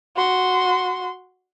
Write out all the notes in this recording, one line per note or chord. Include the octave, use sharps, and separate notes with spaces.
F#4 C6